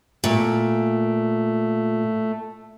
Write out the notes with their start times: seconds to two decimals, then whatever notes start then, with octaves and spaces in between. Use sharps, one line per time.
0.24 A#2 A3